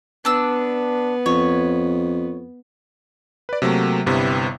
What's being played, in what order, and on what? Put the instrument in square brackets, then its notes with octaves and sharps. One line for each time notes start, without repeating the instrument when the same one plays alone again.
[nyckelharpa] B3 [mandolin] D4 E6
[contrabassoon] F2 [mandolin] C#5
[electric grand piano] B4 D5
C3 F#3 A3 A#3
G1 G2 C3 B3 E4